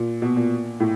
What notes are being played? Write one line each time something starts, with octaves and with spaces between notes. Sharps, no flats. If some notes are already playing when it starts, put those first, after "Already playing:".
Already playing: A#2
B2
A#2
A2